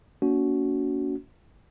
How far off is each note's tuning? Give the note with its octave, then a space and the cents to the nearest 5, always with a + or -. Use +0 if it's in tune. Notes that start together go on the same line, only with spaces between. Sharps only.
A#3 +0 C#4 +45 F#4 +0